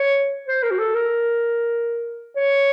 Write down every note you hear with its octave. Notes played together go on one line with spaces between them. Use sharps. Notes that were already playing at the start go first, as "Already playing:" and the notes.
Already playing: C#5
C5
A#4
F#4
A4
A#4
C#5